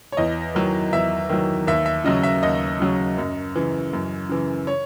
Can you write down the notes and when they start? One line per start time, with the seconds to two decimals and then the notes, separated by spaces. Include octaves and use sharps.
0.12 C#5
0.17 E2 D#5
0.55 D#3 F#3
0.93 E2 E5
1.29 D#3 F#3
1.67 D#2 E5
1.86 E5
2.04 C#3 F#3 D#5
2.23 E5
2.43 D#2 D#5
2.80 C#3 F#3
3.18 F#2
3.56 C#3 E3
3.93 F#2
4.29 C#3 E3
4.67 C#5